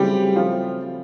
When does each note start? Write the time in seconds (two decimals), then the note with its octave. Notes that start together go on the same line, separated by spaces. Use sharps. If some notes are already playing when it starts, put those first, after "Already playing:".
Already playing: C#3 F#3 G3 A3 C4 E4 G4
0.36 F3 F4